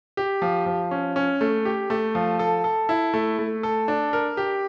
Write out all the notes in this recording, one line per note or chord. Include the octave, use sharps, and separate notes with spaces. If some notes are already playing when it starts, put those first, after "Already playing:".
G4
F3
F3
C#4
C#4
A3
G4
A3
F3
A4
A4
E4
A3
A3
A4
D4
A#4
G4